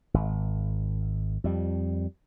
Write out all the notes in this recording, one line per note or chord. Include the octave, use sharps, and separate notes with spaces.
G#1
F2 G3